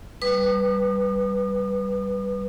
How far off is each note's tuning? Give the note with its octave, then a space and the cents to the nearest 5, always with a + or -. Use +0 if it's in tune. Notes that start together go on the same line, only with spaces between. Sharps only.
G3 -10 B4 +0 D#6 -45